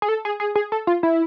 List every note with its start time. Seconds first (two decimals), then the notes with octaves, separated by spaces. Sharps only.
0.02 G#4
0.09 A4
0.25 G#4
0.40 G#4
0.55 G#4
0.72 A4
0.87 F4
1.03 E4